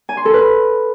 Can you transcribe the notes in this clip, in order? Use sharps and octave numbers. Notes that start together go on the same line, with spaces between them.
G#5
C6
A4
B4